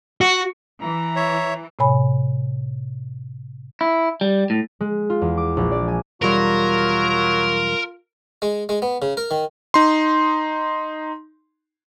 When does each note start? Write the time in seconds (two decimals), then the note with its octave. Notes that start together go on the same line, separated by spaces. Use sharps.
0.21 F#4
0.82 E3 A#5
1.16 C#5 E5
1.79 A2 C3 C#5 G#5 B5
3.81 E4
4.21 G3
4.50 A2
4.81 G#3
5.10 F4
5.22 E2
5.37 D6
5.57 A#1
5.72 D5
5.88 G#5
6.22 B1 E2 F#3 G3 F4 A#4
8.42 G#3
8.69 G#3
8.82 B3
9.02 C#3
9.17 A#4
9.31 D#3
9.74 D#4 C6